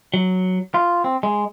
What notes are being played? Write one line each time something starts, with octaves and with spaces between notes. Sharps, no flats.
F#3
F4
C4
G#3